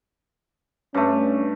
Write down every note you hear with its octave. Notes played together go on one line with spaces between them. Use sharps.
G2 A3 C#4